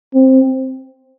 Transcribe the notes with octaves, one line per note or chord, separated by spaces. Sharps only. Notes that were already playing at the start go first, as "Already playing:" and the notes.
C4